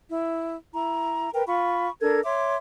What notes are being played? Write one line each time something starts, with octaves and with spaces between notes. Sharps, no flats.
E4
E4 A#5
A#4 B4 G5
F4 B5 C#6
D4 A4 A#4 G#6
C#5 E5 C6 D6